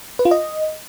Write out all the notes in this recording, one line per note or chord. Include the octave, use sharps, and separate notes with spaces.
B4
F4
D#5